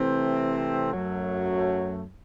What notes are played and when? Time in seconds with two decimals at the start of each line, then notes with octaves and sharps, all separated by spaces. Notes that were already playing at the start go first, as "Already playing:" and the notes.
Already playing: C3 E3 A3 C4
0.93 F#2 F#3 A3